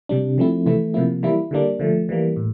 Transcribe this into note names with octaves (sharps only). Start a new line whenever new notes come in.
C3 G3 D4
F3 A3 C4 E4
C3 E3 A3 E4
C3 F3 A#3 E4
E3 G3 A#3 E4
D3 G3 A#3 D4
D3 F3 A3
E3 G3 A#3
A2